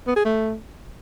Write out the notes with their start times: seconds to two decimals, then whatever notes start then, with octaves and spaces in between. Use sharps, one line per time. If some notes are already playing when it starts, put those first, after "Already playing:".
0.07 B3
0.16 G#4
0.25 A3